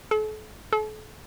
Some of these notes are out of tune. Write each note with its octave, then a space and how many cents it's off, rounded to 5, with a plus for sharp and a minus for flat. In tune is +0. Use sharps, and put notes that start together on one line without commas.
A4 -40
A4 -40